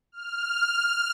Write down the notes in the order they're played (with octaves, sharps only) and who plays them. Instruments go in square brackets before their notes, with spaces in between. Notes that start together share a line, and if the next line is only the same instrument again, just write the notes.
[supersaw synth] F6